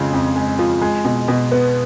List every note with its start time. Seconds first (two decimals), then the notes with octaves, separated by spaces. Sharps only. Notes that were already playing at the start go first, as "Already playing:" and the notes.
Already playing: F2 C#3 F3 G#3
0.13 F2
0.36 G#3
0.59 F3
0.82 G#3
1.05 B2
1.28 B2
1.52 B3